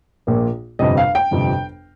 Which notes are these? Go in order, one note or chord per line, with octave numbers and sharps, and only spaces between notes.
A#1 A#2 A#3
G1 F2 C3 D#5
F5
G5
G1 F2 C3